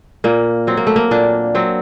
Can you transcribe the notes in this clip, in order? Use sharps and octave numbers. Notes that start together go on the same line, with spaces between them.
A#2 A#3
F#3 C4
A#3
A3
A#3
A#2 D4
F#3 C4